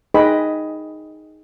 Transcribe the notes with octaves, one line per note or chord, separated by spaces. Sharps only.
D#4 G#4 B4 D#5 G5 B5